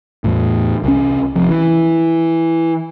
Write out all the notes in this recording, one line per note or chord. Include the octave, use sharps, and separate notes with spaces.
E2 A2
C2 C#4
F1 F2
E3